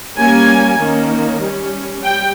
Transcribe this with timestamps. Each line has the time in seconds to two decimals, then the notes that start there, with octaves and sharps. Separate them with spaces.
0.17 G3 A#3 C#4 G#5
0.79 D#3 A#3 C#4
1.41 G3 C#4
2.03 G3 G5